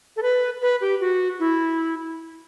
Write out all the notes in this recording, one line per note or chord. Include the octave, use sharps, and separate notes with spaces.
A4
B4
B4
G4
F#4
E4